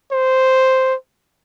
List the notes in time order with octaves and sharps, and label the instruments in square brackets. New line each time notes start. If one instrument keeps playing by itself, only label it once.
[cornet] C5